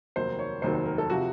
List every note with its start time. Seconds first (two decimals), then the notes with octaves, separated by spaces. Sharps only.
0.16 F1 D#2 D#3 F#3 C5
0.39 C#5
0.62 F1 D#2 D#3 F#3 C5
0.74 C5
0.86 A#4
0.98 A4
1.10 C3 F3 F#4